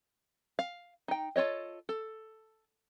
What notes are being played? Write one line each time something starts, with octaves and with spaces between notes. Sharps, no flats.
F5
D#4 G5
F4 A4 C#5 D#5
A4